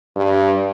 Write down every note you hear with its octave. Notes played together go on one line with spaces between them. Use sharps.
G2